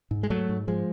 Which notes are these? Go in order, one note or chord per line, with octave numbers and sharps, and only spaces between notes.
G#2
G#3
G#2 F#3 A3
G#2
G#2 F3 G#3